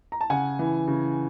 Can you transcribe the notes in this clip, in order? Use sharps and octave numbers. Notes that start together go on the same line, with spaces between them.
A#5
A5
C#3 F#5 G#5
E3
C#3